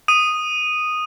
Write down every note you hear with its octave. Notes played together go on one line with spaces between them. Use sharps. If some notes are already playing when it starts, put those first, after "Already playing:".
D#6 D#7